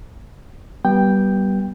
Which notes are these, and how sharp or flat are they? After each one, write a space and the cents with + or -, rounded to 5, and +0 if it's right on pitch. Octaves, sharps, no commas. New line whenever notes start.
G3 -20 B3 -25 G5 +0